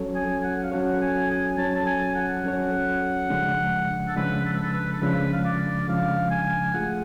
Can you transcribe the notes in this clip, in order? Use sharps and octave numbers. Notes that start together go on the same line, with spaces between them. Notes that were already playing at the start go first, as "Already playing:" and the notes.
Already playing: F#3 C#4 F#4 A4 C#5
G#5
F#5
F5
F#3 C#4 F#4 A4 C#5 F#5
G#5
G#5
F#3 C#4 F#4 A4 C#5 A5
A5
G#5
F#5
F#3 C#4 F#4 A4 C#5
C#3 F3 G#3 D4
A4
C#3 F3 G#3 D4 B4
A4
B4
A4
B4
A4
C#3 F3 G#3 D4 B4
F5
D5
C#3 F3 G#3 D4 F5
G#5
A3 F4 G#4 F#5